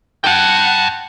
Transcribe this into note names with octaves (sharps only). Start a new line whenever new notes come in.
F#5 G5 A5